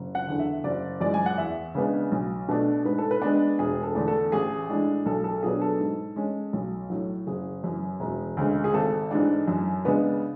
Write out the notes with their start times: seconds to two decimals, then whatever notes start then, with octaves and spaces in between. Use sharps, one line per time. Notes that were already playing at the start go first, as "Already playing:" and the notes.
Already playing: F#1
0.15 F#5
0.27 E2 D3
0.39 E5
0.64 F#1 D5
1.01 F#2 E3 G#3 D5
1.14 G#5
1.26 F#5
1.38 E2 E5
1.75 C#3 G#3 B3 D4
2.12 B1
2.48 B2 A3 D4
2.85 G#2 B4
2.98 A4
3.11 B4
3.22 G#3 B3 D4
3.59 E1 G#4
3.83 A4
3.95 E2 D3 A3 D4
4.08 A4
4.32 A1 G#4
4.69 A2 G#3 D4
5.06 B1 A4
5.24 A4
5.43 B2 F#3 B3 D4 G#4
5.62 A4
5.80 G#2
6.16 G#3 C#4
6.53 B1
6.90 A2 F#3
7.27 F#1 G#4
7.64 F#2 E3
8.00 E1
8.37 D2 C#3 G#3
8.64 G#4
8.74 G#1 A4
9.11 G#2 E3 G#3 D4
9.48 F#2
9.85 C#3 G#3 B3 D4